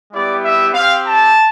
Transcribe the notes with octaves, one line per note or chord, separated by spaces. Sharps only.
G3 B3 E4 G4 D5
E5
C4 G4 F5
A5